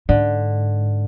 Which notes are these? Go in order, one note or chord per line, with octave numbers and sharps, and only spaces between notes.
G#2 D3